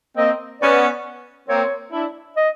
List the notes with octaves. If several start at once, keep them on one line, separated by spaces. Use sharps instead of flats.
A#3 C4 D#5
B3 C#4 D5
A#3 C4 C#5
D4 E4
D#5